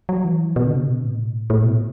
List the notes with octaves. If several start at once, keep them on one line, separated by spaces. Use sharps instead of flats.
F#3
E3
B2
D3
C3
B2
A2
A2
B2